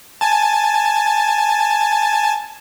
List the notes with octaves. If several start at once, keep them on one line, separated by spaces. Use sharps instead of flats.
G#5 A5